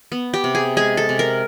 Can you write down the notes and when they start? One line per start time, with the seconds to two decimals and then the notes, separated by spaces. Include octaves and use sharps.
0.12 B3
0.34 G4
0.44 C3
0.55 G#4
0.77 G#3 G#4
0.97 A4
1.09 C3
1.19 A#4